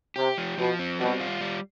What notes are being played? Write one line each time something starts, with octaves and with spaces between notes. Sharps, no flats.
C3 G4
F3
B2 F3
C4
B2 G3
F4
G3